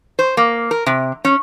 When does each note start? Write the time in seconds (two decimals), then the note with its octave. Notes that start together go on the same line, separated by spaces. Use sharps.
0.19 C5
0.37 A#3
0.71 A#4
0.86 C3
1.25 C#4